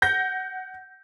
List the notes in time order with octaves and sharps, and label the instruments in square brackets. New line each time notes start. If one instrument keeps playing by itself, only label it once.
[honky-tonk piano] F#5 G6 A#6